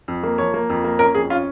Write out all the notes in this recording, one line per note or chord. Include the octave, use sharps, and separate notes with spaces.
F2
A#3
F3 C#5
A#3
F2
A#3
C#4 A#4
F2 G#4
C#4 F4